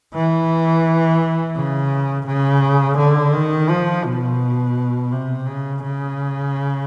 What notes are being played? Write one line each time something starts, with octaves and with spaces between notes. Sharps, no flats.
E3
C#3
C#3
D3
D#3
F3
B2
C3
C#3
C#3